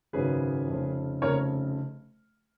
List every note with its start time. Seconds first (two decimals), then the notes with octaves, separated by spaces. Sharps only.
0.13 G#1 F#2 C#3 F#3 G#4 B4
0.68 F1 F2 C#3
1.22 F1 F2 C#3 A#4 C#5